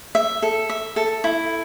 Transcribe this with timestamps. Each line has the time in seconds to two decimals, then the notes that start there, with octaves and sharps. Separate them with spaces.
0.15 E5
0.42 A4
0.69 E5
0.96 A4
1.24 E4